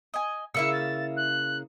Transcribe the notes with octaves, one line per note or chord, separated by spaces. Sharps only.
D#5 G#5
C#3 A#3 E4 E5 E6 C#7
A6
F#6